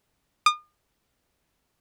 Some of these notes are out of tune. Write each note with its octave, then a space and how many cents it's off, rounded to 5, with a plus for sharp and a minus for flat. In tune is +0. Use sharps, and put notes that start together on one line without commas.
D#6 -40